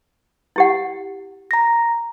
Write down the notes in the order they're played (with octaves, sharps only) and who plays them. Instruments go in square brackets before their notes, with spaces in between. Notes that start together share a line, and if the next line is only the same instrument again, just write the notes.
[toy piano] E4 G4 F#5
[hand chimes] A#5 A#6